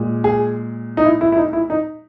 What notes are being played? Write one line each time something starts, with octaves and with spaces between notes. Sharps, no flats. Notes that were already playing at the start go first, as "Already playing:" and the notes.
Already playing: A#2 G#3
G#4
D#4
E4
E4
E4
D#4
E4
D#4